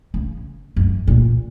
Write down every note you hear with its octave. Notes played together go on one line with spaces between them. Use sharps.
C#3
F#2
A#2